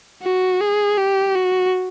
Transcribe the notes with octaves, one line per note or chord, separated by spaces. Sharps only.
F#4
G#4
G4
F#4